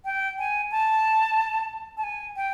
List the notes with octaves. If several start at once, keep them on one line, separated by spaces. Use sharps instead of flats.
G5
G#5
A5
A5
G#5
G5